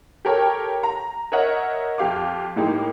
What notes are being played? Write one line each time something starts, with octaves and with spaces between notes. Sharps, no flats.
G4 A4 A#4 C#5 G5
A#5
A#4 C#5 D#5 E5 F#5
F2 G4 F5 D6
A2 G#3 A#3 D#4 G4